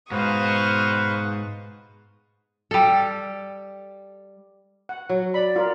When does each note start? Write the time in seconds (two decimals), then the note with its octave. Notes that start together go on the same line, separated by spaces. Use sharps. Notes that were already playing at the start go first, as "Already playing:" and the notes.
0.11 G#2 B2 F#4 B4 C5 F5 C#6 D#6
2.71 G3 A4
4.89 F#5
5.09 F#3
5.34 D5 B5
5.56 F4 A#4